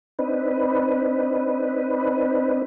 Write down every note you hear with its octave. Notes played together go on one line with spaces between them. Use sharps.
C4 D4 D#4 B4